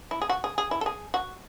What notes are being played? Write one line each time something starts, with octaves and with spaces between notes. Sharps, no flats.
E4
G#4
F#4
G#4
G#4
E4
A4
G#4
F#4